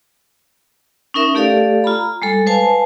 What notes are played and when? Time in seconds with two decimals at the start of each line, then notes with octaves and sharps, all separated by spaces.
1.14 C#4 D#4 A#4 E5
1.35 A3 G4 A4 D5 F5
1.84 F4 A#5 B5
2.22 G3 G#3 A4
2.47 B4 C5 F5 G#5 A5